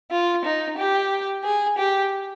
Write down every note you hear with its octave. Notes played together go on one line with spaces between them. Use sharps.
F4
D#4
G4
G#4
G4